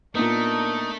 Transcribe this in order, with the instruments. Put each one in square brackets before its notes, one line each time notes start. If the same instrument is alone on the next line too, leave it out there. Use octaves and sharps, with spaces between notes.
[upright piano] A#2 B3 [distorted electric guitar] A3 [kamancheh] D4 A#4 [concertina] D#4